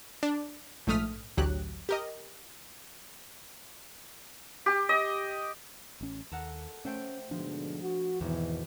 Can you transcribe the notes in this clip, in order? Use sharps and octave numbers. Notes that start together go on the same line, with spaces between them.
D4
A#1 G#2 A3 D#6 F6 B6
A1 D2 F#3 G4 F#6
G4 A#4 D#5
G4
D#5
A1 C#4
D#2 A4 A#4 F#5
A3 C#4 C5 G5
G#2 B2 D3 F3 D4
F#4
G#1 E2 B2 E3